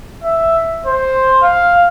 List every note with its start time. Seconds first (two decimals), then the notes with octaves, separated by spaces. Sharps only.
0.24 E5
0.86 C5
1.43 F5